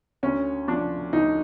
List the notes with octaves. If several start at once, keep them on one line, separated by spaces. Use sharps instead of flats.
D2 C#4
F3 D4
D2 D#4